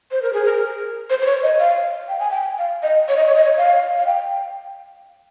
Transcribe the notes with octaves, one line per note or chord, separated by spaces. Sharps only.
C5
A#4
G#4
A#4
C5
C5
C#5
D#5
F5
G5
G#5
G5
F5
D#5
C#5
D#5
C#5
D#5
C#5
F5
F5
G5